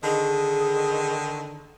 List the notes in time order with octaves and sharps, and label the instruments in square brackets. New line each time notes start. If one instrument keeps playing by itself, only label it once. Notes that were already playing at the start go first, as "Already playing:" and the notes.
[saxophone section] D3 D#3 [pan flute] G#4